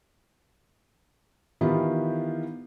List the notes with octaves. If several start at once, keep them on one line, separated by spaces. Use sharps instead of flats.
D#3 E3 B3 E4 F4 G4